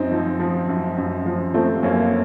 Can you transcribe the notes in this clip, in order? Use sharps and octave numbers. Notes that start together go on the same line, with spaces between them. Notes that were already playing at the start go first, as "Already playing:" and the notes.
Already playing: F#2 C4 D#4
F3
F3
F#2
F#2
F3
F3 A3 C4
F#2 A#3 C#4